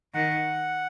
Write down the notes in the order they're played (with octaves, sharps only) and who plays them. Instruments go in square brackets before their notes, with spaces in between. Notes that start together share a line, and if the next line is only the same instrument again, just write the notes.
[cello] D#3 [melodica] F#5